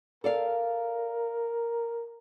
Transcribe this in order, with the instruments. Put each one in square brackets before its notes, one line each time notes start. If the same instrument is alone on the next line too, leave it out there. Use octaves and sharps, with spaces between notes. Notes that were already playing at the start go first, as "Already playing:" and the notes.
[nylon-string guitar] A4 D5 F5 [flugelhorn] A#4